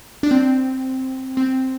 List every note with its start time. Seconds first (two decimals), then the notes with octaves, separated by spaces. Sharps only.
0.23 D4
0.31 C4
1.37 C4